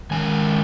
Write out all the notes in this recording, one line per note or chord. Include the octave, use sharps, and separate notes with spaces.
D#3 G#3 C#4 G#5